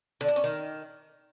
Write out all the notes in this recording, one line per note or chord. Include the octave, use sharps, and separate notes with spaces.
D3
D4
C#4
D#3